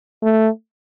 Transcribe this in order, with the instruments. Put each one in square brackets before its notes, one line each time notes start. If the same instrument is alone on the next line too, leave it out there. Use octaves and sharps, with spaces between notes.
[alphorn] A3